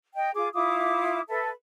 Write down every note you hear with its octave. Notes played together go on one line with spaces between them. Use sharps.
D#5 G5
F4 G#4 D6
E4 F4 D6 D#6
A4 B4 E5